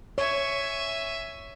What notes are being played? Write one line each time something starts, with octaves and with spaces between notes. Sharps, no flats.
C#5 E5 G#5